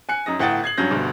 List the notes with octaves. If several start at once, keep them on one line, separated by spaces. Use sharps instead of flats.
G#5 F#6 C#7
F#2 D#4 D#6 A#6
G1 A2 F#5 G5 D#6 A6
G#6 C7 F#7
G2 F#3 C#4 G6 A#6
D2 G2 B2 D3